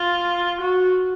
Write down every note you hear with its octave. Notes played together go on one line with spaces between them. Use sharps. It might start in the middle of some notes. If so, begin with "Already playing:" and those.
Already playing: F4
F#4